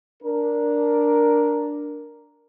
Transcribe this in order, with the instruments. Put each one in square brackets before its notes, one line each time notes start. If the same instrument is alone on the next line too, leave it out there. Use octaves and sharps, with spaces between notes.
[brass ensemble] D4 A#4